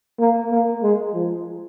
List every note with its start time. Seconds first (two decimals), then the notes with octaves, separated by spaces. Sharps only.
0.20 A#3
0.51 A#3
0.82 G#3
1.14 F3